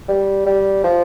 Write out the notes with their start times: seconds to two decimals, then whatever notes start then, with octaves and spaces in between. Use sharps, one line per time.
0.08 G3
0.46 G3
0.84 F3